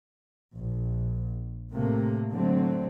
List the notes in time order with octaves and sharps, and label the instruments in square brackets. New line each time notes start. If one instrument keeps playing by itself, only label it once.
[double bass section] A#1
A2 C3 A3 A#3
D3 F#3 A3 C4